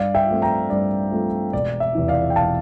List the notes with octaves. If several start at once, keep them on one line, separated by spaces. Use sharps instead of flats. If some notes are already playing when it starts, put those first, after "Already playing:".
Already playing: G2 D5 F5
E5 G5
F3 A3 C4
G5 A#5
G2 D5
F3 A3 C4
E1 D5
E5
E2 C3 E3
D5 F5
G5
E1 F5 A5